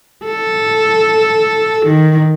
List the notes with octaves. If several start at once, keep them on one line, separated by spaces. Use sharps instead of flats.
A4
D#3